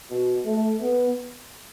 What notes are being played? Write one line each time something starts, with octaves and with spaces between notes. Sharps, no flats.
B2
A3
B3